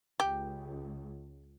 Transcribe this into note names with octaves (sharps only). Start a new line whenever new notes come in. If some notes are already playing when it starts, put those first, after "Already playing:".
C#2 G4